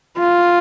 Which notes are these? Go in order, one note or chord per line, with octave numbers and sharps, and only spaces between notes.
F4